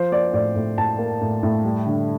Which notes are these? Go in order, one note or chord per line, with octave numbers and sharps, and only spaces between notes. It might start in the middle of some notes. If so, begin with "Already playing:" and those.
Already playing: F3 C5
A#3 D5
A2 D5
A2
A2 A5
A#3
A2
A2
G3
D3